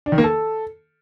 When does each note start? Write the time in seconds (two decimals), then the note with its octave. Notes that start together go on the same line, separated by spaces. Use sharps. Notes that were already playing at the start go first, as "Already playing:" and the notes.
0.06 D4
0.12 D#3
0.18 A#3
0.24 A4